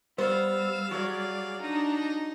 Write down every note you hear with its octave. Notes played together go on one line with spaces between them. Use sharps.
G3 B3 C5 F5 E6
F#3 G#4 C#5 D5
D4 D#4 A#5